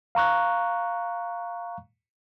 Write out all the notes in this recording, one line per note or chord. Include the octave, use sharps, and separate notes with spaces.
F5 A#5 C#6 F#6